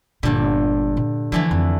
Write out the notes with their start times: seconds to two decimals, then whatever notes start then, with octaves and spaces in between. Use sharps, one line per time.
0.23 G1 G2 A#2 D3
0.97 A#2
1.32 D3 E3 F3 A3
1.51 F2